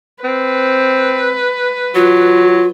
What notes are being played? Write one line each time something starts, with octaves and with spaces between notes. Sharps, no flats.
C4 B4
F#3 F4